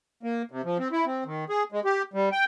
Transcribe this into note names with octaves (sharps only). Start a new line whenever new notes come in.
A#3
C3
F3
C4
E4
C4
D#3
G#4
G#3
G4
G3
G5